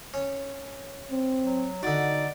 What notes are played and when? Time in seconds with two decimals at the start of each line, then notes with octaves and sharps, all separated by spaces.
0.14 C#4
1.11 C4
1.45 F#3
1.83 D3 D#4 F#4 D5